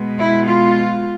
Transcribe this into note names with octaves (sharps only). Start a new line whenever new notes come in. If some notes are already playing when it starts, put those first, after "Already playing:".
Already playing: B2 G#3 B3
E4
F4